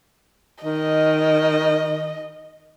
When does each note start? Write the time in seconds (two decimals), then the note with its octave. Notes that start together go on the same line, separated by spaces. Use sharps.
0.64 D#3 D#5